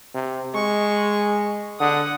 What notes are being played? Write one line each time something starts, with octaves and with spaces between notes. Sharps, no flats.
C3
G#3 C#6
D3 F#5 D#6